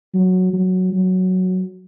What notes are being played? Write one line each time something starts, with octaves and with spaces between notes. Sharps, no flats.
F#3
F#3
F#3